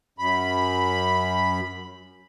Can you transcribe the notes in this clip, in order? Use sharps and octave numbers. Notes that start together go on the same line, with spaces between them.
F#2 B5